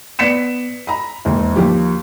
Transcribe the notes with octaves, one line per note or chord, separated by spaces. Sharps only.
B3 D5 B6 C#7 E7
A#5 B5
E1 D#2
D#2 F3 G4